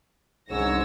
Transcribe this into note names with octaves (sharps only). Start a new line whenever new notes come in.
F#1 C2 G#2 D3 C#5 E6 A#6